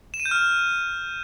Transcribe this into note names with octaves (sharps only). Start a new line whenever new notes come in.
E7
D#7
G6
F6